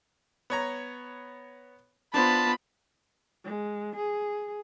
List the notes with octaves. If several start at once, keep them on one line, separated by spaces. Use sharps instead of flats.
B3 C#5 A#5
B3 D4 F4 C5 A5 B5
G#3
G#4